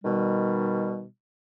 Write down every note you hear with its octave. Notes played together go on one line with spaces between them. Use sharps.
B2 D#3 G3